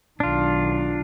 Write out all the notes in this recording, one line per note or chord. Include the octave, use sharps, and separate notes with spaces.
B1 D#3 D4 F4